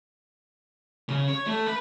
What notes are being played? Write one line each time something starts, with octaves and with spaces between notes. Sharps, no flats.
C#3
C#5
A3
B4